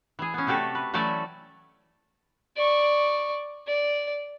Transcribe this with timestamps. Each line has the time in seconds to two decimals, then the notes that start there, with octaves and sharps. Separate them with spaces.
0.19 E3 G#4
0.34 B3 C#4
0.47 C3 A3 F#4 G4 A4
0.75 B4
0.94 E3 F#3 A3 C#4 A4 D5
2.57 D5 C#6
3.67 D5